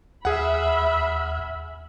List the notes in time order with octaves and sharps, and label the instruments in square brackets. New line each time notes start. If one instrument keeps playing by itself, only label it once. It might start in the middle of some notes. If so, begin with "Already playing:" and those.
[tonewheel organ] D#2 F6 [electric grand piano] G#4 F#5 [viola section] E5 B5